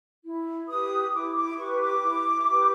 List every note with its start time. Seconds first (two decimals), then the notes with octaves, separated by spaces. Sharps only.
0.24 E4
0.69 G4 B4 D#6
1.13 E4 D6
1.35 D6
1.57 G4 B4 C#6
1.80 D6
2.02 E4
2.47 G4 B4